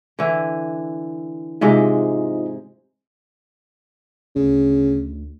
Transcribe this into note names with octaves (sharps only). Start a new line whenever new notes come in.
D3 E3
G#2 C3 G#3 D#4 F4 D#5
D2 C#3